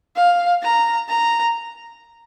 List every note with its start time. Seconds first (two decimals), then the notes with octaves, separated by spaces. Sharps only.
0.17 F5
0.63 A#5
1.09 A#5